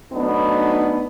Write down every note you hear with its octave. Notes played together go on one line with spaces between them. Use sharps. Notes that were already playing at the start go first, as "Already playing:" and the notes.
F#3 A3 B3 D4 D#4